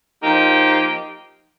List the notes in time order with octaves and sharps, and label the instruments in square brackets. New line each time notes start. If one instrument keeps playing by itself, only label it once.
[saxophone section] F3 A#3 D#4 G4